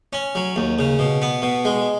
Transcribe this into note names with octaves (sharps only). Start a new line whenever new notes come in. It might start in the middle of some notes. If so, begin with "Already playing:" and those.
C#4
F#3
D#2
C#3
B2
B3
B2
G#3